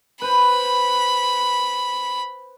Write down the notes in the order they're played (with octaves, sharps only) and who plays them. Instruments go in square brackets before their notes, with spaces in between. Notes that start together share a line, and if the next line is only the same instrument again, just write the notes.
[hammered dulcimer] B4 C5 [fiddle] B5